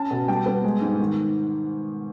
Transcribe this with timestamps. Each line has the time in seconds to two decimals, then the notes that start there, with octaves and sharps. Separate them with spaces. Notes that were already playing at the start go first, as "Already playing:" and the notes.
Already playing: C#4 A5
0.11 B2
0.28 G3 G5
0.46 B3
0.64 G#3
0.81 G#2
1.00 D#3